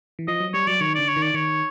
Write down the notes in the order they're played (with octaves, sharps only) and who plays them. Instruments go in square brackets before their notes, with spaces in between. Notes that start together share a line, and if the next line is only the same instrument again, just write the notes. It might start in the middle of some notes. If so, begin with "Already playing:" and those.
[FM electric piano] E3
[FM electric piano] F3 [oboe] D#5
[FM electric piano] F#3
[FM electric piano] G3 [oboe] C#5
[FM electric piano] F#3 [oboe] D5
[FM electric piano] D#3 [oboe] C#5
[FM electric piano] D3 [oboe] D5
[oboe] C#5
[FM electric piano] D#3
[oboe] D5
[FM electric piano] D#3 [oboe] C#5